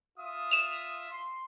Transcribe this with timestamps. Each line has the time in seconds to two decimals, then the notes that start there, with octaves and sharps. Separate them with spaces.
0.18 F4 E5 D#6
0.51 E7 F7
1.11 C6